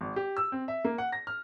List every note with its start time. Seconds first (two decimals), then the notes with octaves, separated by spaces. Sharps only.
0.01 G#1
0.16 G4
0.37 E6
0.52 C4
0.68 E5
0.85 A#3
0.98 F#5
1.12 A#6
1.27 F6